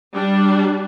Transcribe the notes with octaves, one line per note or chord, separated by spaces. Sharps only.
G3 D4